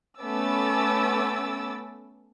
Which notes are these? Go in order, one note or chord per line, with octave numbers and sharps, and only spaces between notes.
A3 B3 C#4 D6 E6 A6